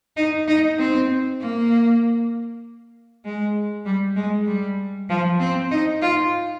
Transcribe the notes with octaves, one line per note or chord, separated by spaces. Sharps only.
D#4
D#4
C4
A#3
G#3
G3
G#3
G3
F3
C4
D#4
F4